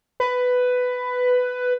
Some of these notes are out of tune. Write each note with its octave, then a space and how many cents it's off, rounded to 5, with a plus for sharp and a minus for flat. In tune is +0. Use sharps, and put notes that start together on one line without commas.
B4 +10